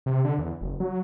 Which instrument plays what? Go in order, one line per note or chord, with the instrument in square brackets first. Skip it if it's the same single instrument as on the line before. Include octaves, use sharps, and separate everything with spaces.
[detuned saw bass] C3
D3
E2
F#1
F#3